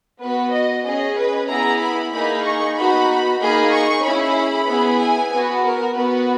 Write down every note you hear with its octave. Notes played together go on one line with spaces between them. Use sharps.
B3 F#4 B4
D#5
C#4 G#4 D#5
B4
B3 E4 G#4 A#5
B5
A#3 D#4 G#4 B5
C#6
B3 D#4 F#4 B5
A#3 D#4 G#4 B5
C#6
C#4 E4 G#4 B5
B3 E4 G#4
G#5
B3 F#4 B4
A#4
B3 F#4 B4